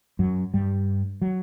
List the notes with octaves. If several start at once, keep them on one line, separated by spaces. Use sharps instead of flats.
F#2 F#3
G2 G3
F#3